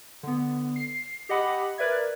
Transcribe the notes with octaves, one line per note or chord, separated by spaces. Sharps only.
D3 B3
C7
G4 D#5 F#5 B5
A#4 B4 D5 E5 G#6